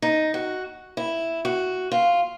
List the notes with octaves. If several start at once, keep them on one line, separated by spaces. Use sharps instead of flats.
D#4
F#4
E4
F#4
F4